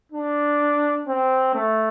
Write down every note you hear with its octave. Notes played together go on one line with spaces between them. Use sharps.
D4
C4
A3